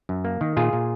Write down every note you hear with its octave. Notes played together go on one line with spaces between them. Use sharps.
F#2
A#3
D#3
A#2 F4 G#4
A#2